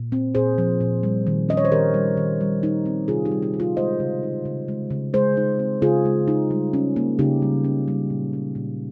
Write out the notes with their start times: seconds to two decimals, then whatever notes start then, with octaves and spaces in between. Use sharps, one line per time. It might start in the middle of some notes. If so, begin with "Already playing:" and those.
Already playing: A#2
0.12 C4
0.35 A#2 G#4 C5
0.58 F3
0.80 A#2
1.03 G3
1.27 D#3
1.49 C#4 D#5
1.57 C#5
1.65 C5
1.72 D#3 G4 A#4
1.94 G3
2.17 D#3
2.41 G3
2.63 D#4
2.86 C4
3.08 C3 F4 G#4
3.25 D#4 G4
3.32 G3
3.42 D#4
3.54 D#4
3.60 F4
3.77 G#3 C5 D#5
4.00 C#3
4.23 D#4
4.45 C#3
4.68 G#3
4.91 C#3
5.14 G#3 G#4 C5
5.37 D#4
5.59 C4
5.82 C#3 F4 G#4
6.05 G#3
6.28 D#4
6.50 G3
6.73 C#4
6.96 A#3
7.19 C#3 D#4 G4
7.42 G3
7.64 C#4
7.88 G3
8.10 A#2
8.33 C#4
8.55 A#2